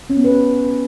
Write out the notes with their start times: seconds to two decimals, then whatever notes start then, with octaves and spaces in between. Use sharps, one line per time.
0.10 C#4
0.17 B3
0.24 B4
0.32 G4